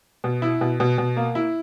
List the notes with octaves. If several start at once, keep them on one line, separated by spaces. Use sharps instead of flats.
B2
E4
B2
B2
B2
A#3
E4